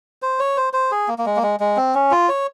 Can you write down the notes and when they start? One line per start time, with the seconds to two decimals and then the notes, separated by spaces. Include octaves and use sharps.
0.22 C5
0.39 C#5
0.57 C5
0.73 C5
0.91 G#4
1.08 A#3
1.18 A#3
1.26 G#3
1.36 A#3
1.43 G#3
1.60 G#3
1.77 C4
1.95 C#4
2.11 F4
2.29 C#5